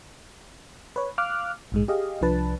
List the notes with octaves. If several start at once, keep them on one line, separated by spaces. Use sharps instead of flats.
B4 C#5
F5 D6 F6 F#6
A#1 G#2 G#3
G4 G#4 D#5 F5
C2 F3 D4 B4 A5